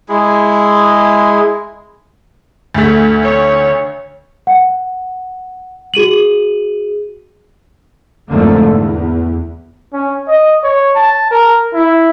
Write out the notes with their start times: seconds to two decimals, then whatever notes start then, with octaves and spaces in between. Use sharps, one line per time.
0.09 G#3 E4 G#4
2.74 D2 A3
3.23 C#5
4.47 F#5
5.94 F#4 G#4 D#7 F#7
8.30 F2 G#2 D3 F3 A3 A#3
8.68 E2
9.93 C#4
10.28 D#5
10.63 C#5
10.95 A5
11.31 A#4
11.74 E4